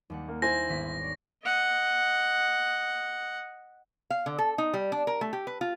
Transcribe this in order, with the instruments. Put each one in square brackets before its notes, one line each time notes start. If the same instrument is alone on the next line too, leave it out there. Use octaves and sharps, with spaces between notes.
[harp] D#2 G3 F#5
[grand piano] A#3
[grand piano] E4 C5 G#5 [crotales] A#6
[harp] G#1 B3 B6
C#5 D5
[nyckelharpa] D#5 F#5
[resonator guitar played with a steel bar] F5
D3
A4
D#4
G3
D4
A#4
A3
G4
B4
F4